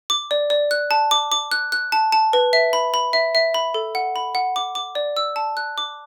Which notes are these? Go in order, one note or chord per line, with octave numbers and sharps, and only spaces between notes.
D6
D5
D5
F#6
A5
D6
D6
F#6
F#6
A5
A5
B4
E5
B5
B5
E5
E5
B5
A4
F#5
B5
F#5
D6
D6
D5
E6
A5
F#6
D6